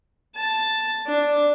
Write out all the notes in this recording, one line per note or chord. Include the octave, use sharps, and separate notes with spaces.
A5
D4